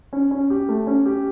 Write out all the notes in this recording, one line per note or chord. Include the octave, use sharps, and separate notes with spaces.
C#4
C#4
G4
A3
C#4
G4